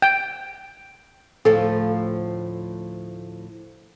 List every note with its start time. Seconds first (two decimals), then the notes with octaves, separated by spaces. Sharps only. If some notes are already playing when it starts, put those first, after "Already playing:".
0.02 G5
1.45 D2 A2 F3 A4